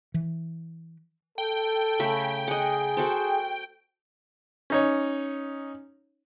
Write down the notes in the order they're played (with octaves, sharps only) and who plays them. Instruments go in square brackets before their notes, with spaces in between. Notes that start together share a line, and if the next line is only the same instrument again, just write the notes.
[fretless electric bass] E3
[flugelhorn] A4 [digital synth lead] G5
[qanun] C#3 A3 B5
[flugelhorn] G#4 [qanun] D#5 F#5
[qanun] F#4 A4 C5
[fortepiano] C#4 D#4 C#5